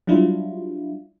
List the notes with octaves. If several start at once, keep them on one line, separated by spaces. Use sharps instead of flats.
F#3 G3 D4 E4 F4